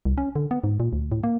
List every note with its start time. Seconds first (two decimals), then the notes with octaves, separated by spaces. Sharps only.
0.05 C2
0.18 C#4
0.36 D3
0.51 B3
0.64 G#2
0.80 A#2
0.93 D2
1.12 A2
1.23 A#3